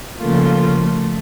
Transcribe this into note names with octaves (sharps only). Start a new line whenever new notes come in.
C#3 F3 A3 A#3 F4 A4
A3